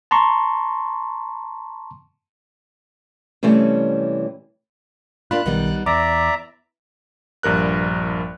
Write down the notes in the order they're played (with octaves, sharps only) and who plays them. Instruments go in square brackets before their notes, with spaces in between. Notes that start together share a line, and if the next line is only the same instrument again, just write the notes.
[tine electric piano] A5 A#5 C6 C#6
[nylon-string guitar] C3 E3 G3 A3 C#4
[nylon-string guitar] A#3 D4 F4 [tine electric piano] B5 [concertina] F#6
[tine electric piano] B1 D#3 [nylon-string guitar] G3 B3 D#4
[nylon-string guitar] E2 [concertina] D5 E5 A#5 [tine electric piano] D6 A#6
[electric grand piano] A#1 G2 A#4 F#6